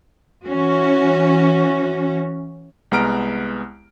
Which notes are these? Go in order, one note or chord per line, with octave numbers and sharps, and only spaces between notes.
E3 C#4 F#4
C2 G#3 B3 A#5 F6 D7